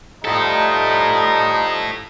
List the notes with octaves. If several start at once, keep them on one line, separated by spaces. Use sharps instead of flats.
F3 G3 D#4 E4 A4